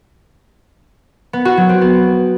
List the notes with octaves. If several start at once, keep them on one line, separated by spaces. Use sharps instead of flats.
B3
F#4
F#3
C4
B3